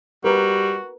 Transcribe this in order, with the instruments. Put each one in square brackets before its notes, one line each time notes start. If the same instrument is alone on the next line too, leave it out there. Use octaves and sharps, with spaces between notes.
[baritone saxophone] G3 [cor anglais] F#4 [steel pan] A#4 B4